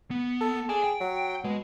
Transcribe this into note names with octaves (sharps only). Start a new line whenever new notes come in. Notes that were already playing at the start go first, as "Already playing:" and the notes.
B3
A4
G#4 D5 A5
G5
F#3
B2 G#3